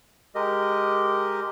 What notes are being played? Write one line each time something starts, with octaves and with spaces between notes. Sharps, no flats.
G#3 G4 A#4 D#5